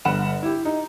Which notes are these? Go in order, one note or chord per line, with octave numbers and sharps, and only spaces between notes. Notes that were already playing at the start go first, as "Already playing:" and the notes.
G1 F#5 B5 E7
E4 G4
D#4